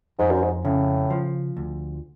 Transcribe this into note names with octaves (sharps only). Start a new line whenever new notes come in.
F2 G#2
F#2
G#2
A2 C#3
F3
D2